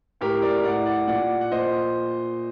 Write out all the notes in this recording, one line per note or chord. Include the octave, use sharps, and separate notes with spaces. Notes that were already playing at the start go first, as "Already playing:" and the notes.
A2 G4 A#4
A#4 D5
A2 D5 F#5
D5 F#5
A#2 D5 F#5
F#5
A#2 C5 D#5